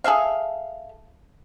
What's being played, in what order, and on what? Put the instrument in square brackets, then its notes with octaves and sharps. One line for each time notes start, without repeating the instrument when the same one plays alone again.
[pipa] G#4 A4 E5 F5